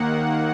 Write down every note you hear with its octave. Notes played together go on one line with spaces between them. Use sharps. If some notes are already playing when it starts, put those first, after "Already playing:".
Already playing: D#2 D#3 A#3 F#5